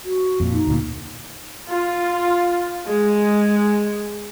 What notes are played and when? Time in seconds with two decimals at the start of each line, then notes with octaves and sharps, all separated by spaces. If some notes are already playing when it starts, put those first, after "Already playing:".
0.05 F#4
0.40 F2 A#2
0.53 D#4
0.67 D2 A#2
1.70 F4
2.85 G#3